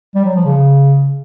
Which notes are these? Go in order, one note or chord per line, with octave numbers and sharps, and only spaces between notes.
G3
F#3
F3
C#3